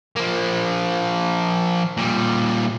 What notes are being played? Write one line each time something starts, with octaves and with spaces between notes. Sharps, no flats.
F3 A#3
A#2 G3